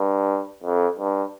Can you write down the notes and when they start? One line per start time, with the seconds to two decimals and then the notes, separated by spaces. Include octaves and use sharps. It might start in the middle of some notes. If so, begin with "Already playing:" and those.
Already playing: G2
0.63 F2
0.99 G2